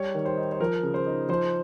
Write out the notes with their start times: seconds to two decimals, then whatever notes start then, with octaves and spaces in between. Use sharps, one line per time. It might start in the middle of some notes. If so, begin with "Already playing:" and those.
Already playing: G3 C#5
0.14 D#3
0.25 C5
0.37 D#4
0.52 C5
0.60 F3 A#4
0.83 C#3
0.94 C5
1.06 D#4
1.29 F3 C5